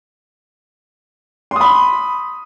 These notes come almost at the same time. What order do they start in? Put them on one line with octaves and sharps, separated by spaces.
C6 D#6 B5